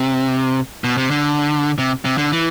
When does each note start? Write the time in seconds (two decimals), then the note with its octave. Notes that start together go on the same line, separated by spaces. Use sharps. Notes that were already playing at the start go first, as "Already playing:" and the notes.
Already playing: C3
0.84 B2
0.98 C3
1.10 D3
1.78 C3
2.05 C3
2.18 D3
2.32 E3